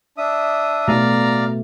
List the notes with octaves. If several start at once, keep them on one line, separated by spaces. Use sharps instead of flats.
D4 E5 D#6
B2 A3 D5 F5 A#5